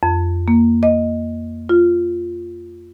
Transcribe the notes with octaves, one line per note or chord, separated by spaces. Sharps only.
F2
A#3
D#5
F4